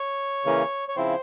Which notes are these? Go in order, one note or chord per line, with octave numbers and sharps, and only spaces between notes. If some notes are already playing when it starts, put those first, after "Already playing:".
Already playing: C#5
C#3 E3 A#3 C#4
C#5
C#3 F3 C4 E4 C5